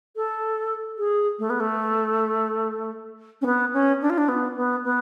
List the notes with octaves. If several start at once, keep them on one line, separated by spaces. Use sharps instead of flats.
A4
G#4
A3
B3
A3
C#4
B3
C#4
D4
F4
D4
B3
B3
B3